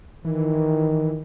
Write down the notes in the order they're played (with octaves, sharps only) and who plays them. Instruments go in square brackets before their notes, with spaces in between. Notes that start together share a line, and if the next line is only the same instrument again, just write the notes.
[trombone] D#3 [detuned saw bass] E3